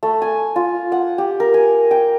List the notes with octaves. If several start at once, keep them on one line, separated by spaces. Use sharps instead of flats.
A3
G#5
F4
F#5
G4
A#4
G#5
G5